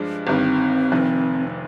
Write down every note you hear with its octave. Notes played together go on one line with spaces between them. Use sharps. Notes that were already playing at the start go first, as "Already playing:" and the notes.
Already playing: G2 F3 G#3 D4
G1 G2 D#3 C4
F1 F2 D#3